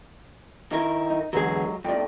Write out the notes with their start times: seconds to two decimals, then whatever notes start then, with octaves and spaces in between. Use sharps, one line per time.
0.72 D#3 E4 A#4
1.10 D#4
1.33 E2 D3 F#3 G#3 G#4
1.84 F2 A2 D5 G5